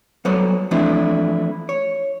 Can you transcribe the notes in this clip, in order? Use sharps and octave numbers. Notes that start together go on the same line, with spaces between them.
F#3 G3 B3 A4 C5 C#5
E3 F3 A3 C4 D4 E4
C#5